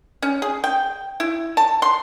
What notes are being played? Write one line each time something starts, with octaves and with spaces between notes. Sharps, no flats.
C#4
G#4
G5
E4
A5
C6